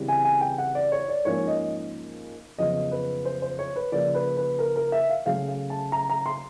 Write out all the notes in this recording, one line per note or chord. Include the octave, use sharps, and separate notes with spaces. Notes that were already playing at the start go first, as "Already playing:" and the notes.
Already playing: C#3 E3 G3 C4
G#5
G#5
G5
F#5
D5
C#5
D5
G#2 F3 A#3 C#4 C#5
D#5
F2 C#3 F#3 B3 D#5
B4
C5
C5
C#5
B4
C#3 F3 A#3 D5
B4
B4
A#4
A#4
E5
F5
C#3 F#3 A3 C#4 F5
F5
A5
A#5
A#5
C6